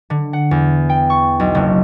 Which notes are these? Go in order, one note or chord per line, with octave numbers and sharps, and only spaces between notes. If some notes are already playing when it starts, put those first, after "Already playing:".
D3
F#5
E2
G5
C#6
B1
F#1